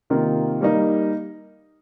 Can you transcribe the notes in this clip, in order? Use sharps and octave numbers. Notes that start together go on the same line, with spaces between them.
C3 D#3 A#3 F4
G3 A#3 D#4